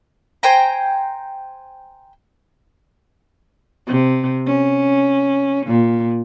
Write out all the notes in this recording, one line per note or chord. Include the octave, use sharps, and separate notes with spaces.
C5 G5 G#5 A#5
C3
C#4
A#2